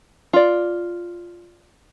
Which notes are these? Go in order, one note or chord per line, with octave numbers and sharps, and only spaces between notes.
F4 D5